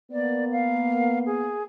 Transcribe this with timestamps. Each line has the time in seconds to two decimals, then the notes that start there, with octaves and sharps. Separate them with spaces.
0.11 A#3 B3 D5
0.52 F5
1.26 G#4